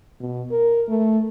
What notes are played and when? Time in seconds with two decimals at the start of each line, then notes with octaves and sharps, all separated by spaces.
0.20 B2
0.51 A#4
0.89 A3